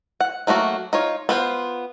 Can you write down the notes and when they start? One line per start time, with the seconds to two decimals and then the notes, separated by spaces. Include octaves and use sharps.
0.21 F#5
0.47 F#3 A3 A#3 F#4 A4
0.93 D#4 F4 C#5
1.29 B3 F4 C5